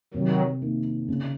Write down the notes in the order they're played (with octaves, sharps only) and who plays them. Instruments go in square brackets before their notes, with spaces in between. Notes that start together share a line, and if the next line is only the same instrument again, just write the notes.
[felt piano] C3 [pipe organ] D#3 F#3
[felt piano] D#3 A#3 D#4
C#3